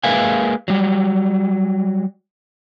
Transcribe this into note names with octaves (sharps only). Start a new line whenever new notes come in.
G#3 A#3 B4 E5 F5 G#5
F#3 G3